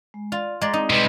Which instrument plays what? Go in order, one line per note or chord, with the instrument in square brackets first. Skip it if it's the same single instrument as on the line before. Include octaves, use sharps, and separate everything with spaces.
[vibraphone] G#3
[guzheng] F4 [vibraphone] D5
[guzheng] G#3 D5 [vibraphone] D#5 A#5
[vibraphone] C4 D#6 [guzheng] D#4
[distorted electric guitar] C3 G3 [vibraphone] G#3 B4 C6